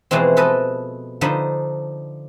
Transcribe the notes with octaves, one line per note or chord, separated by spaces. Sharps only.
B2 E3 F3 G#3 C4
A4 B4 D#5 A5
D3 F3 D#4 B5